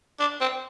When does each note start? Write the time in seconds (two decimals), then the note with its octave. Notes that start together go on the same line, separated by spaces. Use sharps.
0.20 D4
0.41 C4